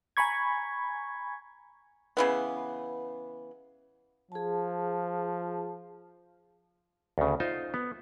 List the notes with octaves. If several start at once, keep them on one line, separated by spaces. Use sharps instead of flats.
G#5 A#5 B5 C#6 G#6
C#3 E3 B3
F3 G#4 A5
D2 C#3
D#4 F4 C5
B3